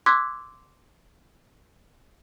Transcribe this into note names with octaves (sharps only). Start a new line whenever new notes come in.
C6 D6 E6 F#6 G#6 B6